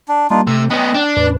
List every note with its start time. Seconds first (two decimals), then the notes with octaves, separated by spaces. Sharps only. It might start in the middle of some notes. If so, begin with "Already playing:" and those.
0.08 D4
0.30 G3 A#3 D4 D#4 F4
0.47 C3 A3 E6
0.70 B3 C#4 D#5 G5 F#6
0.94 D4 D5
1.17 E2 A2 B4 D5